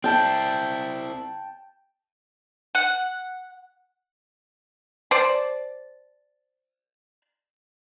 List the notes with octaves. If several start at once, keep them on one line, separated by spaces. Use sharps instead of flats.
C4 E4 G5 A5
F#5
C5 D5 A5